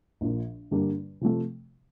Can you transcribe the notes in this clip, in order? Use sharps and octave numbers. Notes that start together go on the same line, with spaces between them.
A#1 A#2 F3
G2 D3 G3 A#3 D4
C3 F3 A3